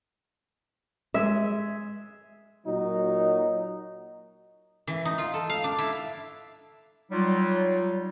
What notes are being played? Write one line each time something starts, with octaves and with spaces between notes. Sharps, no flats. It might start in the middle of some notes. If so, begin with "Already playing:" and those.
G#3 G#4 E5
A#2 F#3 D#4
E3
D#4
F4
A4
F5
D4
E4
F#3 G3 D#4 F4